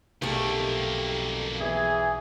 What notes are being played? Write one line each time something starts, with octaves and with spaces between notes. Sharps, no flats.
B1 F2 A3 A#3 G4
E2 E3 G#4